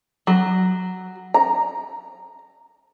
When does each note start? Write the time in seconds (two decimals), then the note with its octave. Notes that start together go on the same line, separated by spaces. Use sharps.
0.27 F#3
1.34 A#5